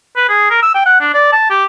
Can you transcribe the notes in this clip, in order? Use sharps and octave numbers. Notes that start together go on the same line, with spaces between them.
B4
G#4
A#4
E6
G5
F#5
D4
D5
A5
G4